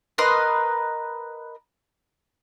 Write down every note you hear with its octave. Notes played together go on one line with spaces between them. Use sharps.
A#4 B4 D#5 C6